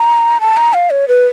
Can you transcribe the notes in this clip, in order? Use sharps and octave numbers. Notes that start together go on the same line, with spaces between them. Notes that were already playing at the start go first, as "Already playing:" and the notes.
Already playing: A#5
A5
A#5
F5
C#5
B4